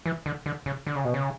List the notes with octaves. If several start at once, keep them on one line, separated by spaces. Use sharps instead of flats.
E3
D3
D3
C#3
D3
C#3
B2
C#3